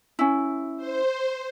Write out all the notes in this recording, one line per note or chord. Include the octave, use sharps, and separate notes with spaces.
C#4 E4
C5